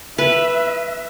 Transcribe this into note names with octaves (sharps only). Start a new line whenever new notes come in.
B4 E5